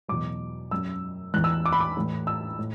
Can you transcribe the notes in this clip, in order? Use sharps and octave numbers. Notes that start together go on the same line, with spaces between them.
E2 B2 F#3 D6
F#2 F#3 E6
E2 E3 F#6
E6
D6
B5
D6
A2 E3
E6
A2